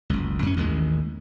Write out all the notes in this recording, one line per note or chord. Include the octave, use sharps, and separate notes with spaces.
F#1 C#2
F#2 C#4
A1 D#2 D#3 G#3